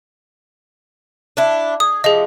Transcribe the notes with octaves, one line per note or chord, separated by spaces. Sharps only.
D4 E4
G#4 D#6
C3 F3 G#4 D#5